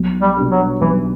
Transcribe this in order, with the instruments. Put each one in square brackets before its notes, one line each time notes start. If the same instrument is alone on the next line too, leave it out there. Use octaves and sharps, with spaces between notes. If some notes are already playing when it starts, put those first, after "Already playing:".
Already playing: [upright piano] B1
[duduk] G3
[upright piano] B2 G3 D4
[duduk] F#3
[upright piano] B1 [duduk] E3